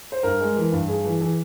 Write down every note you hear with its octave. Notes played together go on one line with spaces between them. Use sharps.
C5
G2 A#4
G#3
E3
G2
G2 G#4
E3
E3